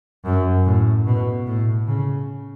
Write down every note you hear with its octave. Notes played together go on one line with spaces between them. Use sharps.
F#2
A2
B2
A2
C#3